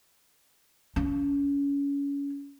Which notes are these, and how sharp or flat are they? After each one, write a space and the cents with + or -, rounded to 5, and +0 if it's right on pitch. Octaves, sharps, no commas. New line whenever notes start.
C#4 +25